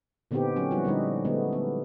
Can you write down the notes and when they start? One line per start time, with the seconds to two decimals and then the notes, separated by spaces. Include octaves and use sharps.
0.31 A#2 D3 B3 C4 D#4 G4
0.56 F#3 C#4 F#4
0.71 F3 G3 B3 E4 F#4
0.85 D3 G3 G#3 D#4
1.25 D3 G#3 A3 B3
1.53 B3